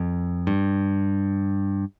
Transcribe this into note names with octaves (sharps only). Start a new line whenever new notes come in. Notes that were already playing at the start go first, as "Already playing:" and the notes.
Already playing: F2
G2